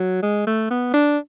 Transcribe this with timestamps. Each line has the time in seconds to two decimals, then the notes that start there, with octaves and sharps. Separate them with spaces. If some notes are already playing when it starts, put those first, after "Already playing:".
Already playing: F#3
0.22 G#3
0.47 A3
0.70 B3
0.94 D4